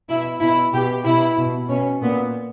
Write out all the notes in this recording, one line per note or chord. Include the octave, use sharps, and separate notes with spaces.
B2 E4
B2 E4
B2 G4
B2 E4
B2
B2 C#4
A#2 B3